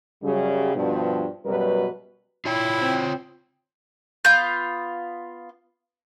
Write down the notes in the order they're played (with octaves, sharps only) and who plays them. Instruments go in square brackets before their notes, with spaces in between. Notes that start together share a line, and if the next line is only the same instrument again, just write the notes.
[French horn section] F#2 C#3 F#3 G3
G2 B2 F3
F#2 B2 F#3 G3 A#4 B4
[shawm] E4 [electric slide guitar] F4 C#5 G5
[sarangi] C4
[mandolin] B3 F4 G6